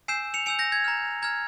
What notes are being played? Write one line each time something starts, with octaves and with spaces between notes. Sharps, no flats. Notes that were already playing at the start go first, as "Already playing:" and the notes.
G#5 E6 G6 C7 E7
C#7 F7
G#5 E6 G6 C#7 F7
G6 A#6
G#6
A#5 F6
A#5 F6 G#6